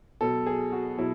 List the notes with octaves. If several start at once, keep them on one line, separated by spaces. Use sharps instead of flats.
B2 F#3 A4
G#4
F#4
B2 F#3 E4